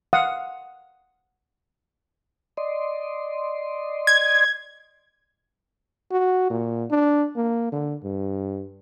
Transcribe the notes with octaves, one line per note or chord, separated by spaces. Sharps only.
F5 F#5 D#6
D5 D#5 C6
G#6
F#4
A#2
D4
A#3
D3
G2